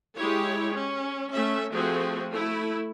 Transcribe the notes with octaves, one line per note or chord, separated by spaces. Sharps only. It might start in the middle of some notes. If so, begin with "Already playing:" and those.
G#3 E4 G4 C#5
C#4
A3 C#4 E5
F3 A3 C4 F#4 G#4
A3 E4